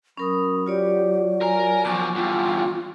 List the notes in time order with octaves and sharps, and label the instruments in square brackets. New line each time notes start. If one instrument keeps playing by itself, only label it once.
[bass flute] F#3 [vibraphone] C#4 A#4 D#6 [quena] B5
[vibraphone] F4 C#5 D5 [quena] G4
[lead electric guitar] A#4 A#5 [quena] G#5
[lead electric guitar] B2 F3 [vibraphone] C#6 D6
[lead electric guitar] E2 G2 [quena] F4